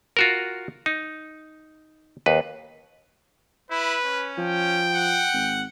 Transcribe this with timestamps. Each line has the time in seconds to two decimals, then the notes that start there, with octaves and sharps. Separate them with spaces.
0.17 F4 F#4 A#4
0.86 D#4
2.26 D#2 B4
3.71 E4 B4
4.06 C#4
4.38 F3 G5
4.92 F#5
5.33 G#1